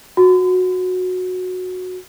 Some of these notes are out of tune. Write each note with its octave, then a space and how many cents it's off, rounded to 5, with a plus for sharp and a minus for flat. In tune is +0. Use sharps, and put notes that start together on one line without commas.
F#4 -15